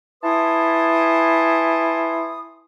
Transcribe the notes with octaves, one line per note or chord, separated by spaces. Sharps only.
E4 B4 G#5 A5 C6 D#6